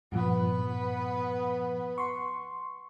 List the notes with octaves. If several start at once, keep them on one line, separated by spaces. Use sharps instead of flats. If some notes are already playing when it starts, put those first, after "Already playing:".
G2 A#2 F3 B3 B4
C6 C#6